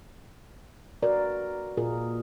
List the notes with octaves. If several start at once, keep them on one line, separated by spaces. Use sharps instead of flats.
F#4 A#4 B4 D5
A#2 F4 G#4 A#4